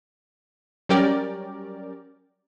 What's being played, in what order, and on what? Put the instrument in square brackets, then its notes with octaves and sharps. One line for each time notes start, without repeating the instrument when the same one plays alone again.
[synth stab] F#3 G3 C#4 G4 A#4 D5